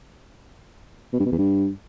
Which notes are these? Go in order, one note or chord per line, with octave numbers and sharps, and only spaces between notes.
B2
G2
B2
E2
G2